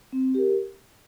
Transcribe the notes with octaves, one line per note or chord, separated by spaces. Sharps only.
C4
G4 A#4